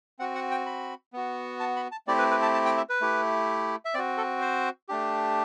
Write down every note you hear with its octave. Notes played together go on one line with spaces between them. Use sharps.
C4 F#4 F#5
F#5
G5
B5
B3 F#4
A5
B5
A5
A3 C4 E4 G4 D5
B4
B4
A5
A5
G5
E5
B4
A3 E4 G4
E5
C4 F#4 D5
A4
C5
A3 D4 G4